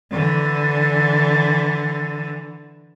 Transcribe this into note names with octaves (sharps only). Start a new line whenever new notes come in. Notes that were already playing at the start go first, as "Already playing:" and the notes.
D3 E3